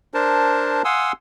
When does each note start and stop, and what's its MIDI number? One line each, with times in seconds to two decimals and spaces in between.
0.14 0.82 62
0.14 0.82 70
0.14 0.82 72
0.14 0.82 81
0.85 1.12 77
0.85 1.12 78
0.85 1.12 80
0.85 1.12 84
0.85 1.12 87
0.85 1.12 88